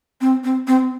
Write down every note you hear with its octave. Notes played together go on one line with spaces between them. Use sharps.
C4
C4
C4